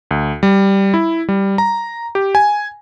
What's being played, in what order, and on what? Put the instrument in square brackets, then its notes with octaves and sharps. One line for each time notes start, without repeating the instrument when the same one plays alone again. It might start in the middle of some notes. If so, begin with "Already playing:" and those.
[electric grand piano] D2
G3
E4
G3
A#5
G4
G#5